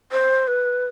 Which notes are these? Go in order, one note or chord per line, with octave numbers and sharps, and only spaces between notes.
C5
B4